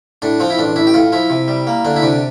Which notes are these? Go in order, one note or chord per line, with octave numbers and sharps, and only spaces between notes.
A2 D4
F3 C4
E4
A1 D4
A1 E4
G4
A2 F4
F3 E4
C3
G3
A#3
D2 D4
E4
C3 D4